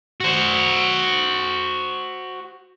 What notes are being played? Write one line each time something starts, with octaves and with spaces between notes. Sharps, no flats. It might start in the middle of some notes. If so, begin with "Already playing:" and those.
F#4 C5